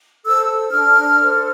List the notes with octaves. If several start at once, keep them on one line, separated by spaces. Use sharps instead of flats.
A4 C5 E6
D4 F6
A4 C5